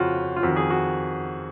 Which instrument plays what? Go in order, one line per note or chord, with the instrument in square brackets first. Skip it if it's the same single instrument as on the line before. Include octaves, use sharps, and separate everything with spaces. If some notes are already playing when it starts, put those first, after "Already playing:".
Already playing: [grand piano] F2 C#3 F4 F#4
F4
F2 F#4
D#3
G#4
F#4